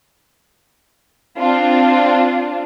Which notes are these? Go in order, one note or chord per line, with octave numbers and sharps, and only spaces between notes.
C4 D4 F4